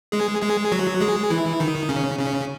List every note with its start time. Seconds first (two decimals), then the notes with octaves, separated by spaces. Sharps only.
0.12 G#3 G#4
0.42 G#3 G#4
0.72 F#3 F#4
1.01 G#3 G#4
1.30 E3 E4
1.60 D#3 D#4
1.89 C#3 C#4
2.18 C#3 C#4